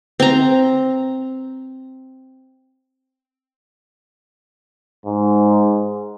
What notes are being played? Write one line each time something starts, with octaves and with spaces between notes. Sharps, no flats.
C4 A#5
G#2